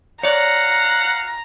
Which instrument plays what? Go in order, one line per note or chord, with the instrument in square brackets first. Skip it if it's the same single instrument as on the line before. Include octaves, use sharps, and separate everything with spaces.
[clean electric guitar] C#5 D5 [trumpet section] F5 F#5 [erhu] A#5